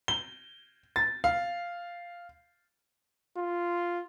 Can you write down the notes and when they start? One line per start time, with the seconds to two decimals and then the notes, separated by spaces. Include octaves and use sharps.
0.08 G7
0.96 A6
1.24 F5
3.37 F4